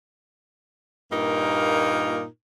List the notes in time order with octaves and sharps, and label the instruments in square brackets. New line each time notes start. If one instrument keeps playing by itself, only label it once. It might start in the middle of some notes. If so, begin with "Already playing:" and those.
[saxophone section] G2 A#2 A#3 D#4 F4 A#4